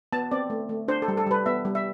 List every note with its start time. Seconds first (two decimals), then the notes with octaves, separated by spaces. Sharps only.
0.13 B3 A5
0.31 C4 D5
0.50 A3
0.69 A3
0.88 D4 C5
1.02 A4
1.08 G3
1.17 A4
1.27 G3 B4
1.46 B3 E5
1.65 G3
1.75 E5